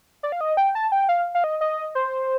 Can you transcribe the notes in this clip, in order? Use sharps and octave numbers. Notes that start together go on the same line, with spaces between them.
D5
F5
D#5
G5
A5
G5
F5
F5
D#5
D#5
C5